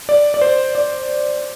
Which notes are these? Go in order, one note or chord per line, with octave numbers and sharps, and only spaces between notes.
D5
D5
C5
D5